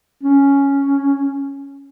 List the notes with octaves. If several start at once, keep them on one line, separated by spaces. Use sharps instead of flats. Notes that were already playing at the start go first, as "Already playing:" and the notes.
C#4